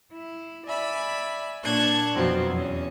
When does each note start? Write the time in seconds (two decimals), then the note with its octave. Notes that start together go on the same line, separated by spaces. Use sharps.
0.12 E4
0.66 D5 E5 G#5 B5
1.63 A#2 D4 A5 C#6 F#6 G#6
2.15 F2 B2 F3 F#3 C4
2.52 E2 C#4